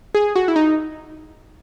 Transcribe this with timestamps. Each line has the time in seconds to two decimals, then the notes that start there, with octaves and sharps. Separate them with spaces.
0.15 G#4
0.36 F#4
0.48 E4
0.56 D#4